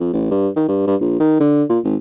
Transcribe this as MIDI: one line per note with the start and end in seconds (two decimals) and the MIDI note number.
0.01 0.13 41
0.13 0.30 33
0.31 0.49 43
0.56 0.67 51
0.68 0.83 43
0.87 0.95 43
1.01 1.18 34
1.20 1.40 51
1.40 1.64 50
1.69 1.79 46
1.84 1.96 32